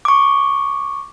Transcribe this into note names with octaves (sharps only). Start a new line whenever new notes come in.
C#6 D6